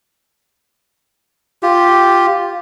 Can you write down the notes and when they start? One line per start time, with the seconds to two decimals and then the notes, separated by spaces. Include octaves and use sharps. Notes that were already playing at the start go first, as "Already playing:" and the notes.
1.63 F4 G4